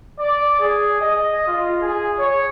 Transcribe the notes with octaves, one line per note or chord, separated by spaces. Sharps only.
D5
G#4
D#5
F4
G#4
C#5